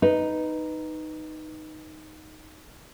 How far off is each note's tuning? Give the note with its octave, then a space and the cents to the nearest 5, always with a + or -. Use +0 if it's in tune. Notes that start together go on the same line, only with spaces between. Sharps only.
D#4 +0 B4 +0